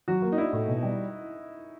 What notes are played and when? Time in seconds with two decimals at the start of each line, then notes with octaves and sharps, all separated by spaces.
0.08 F#3 F#4
0.22 A#3
0.32 D#4
0.38 D4 E4
0.53 A2
0.68 B2
0.83 G3